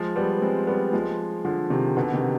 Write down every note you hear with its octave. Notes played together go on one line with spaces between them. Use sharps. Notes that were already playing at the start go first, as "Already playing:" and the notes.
Already playing: F3 G#3
G3 B3
G#3 C4
G3 B3
F3 G#3
D3 F3
C3 D#3
B2 D3
C3 D#3